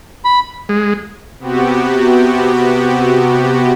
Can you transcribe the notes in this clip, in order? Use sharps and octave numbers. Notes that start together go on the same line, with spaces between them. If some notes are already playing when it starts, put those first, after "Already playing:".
B5
G#3
C3 B3 F#4 G4